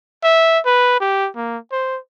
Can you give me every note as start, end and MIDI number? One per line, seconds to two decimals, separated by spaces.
0.24 0.59 76
0.65 0.96 71
1.00 1.29 67
1.36 1.57 58
1.72 1.98 72